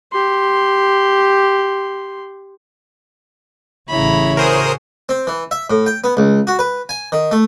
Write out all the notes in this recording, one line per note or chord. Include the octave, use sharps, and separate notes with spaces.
G4 C6
A1 C#3 E4 C#5 A#5 B5
F#4 G#4 A#4 C5 D#6
C4
E3
E5
A2
G5
B3
C#2
F#4
B4
G#5
D#3
A3